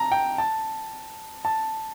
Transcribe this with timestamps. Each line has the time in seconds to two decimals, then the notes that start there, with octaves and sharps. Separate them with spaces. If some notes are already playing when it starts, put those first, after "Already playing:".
Already playing: A5 A#5
0.12 G5
0.38 A5
1.45 A5